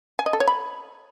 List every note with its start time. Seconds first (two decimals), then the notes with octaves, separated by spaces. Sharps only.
0.19 G#5
0.26 D#5
0.33 A4
0.40 C#5
0.47 B5